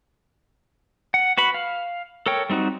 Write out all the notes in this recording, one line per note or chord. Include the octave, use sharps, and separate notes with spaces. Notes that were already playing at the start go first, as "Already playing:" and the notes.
F#5
F#4 B4 B5
F5
A4 A#4 C#5 G5
G3 C4 D#4 F#4